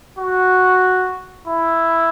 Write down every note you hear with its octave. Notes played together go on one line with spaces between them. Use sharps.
F#4
E4